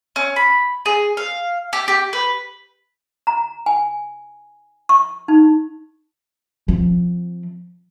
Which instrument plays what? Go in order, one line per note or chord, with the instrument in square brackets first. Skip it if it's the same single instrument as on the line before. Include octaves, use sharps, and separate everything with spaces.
[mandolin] C#4
B5
G#4
F5
G4
G4
B4
[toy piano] A#5
G#5
C#6
D#4
[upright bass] F3 C4